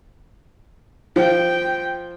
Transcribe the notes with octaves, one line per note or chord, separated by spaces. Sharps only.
F3 G5